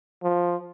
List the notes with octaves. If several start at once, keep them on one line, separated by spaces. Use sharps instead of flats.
F3